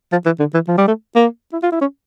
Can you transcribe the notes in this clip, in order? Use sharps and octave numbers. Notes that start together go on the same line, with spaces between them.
F3
E3
D3
E3
F3
G3
A3
A#3
E4
F4
E4
C#4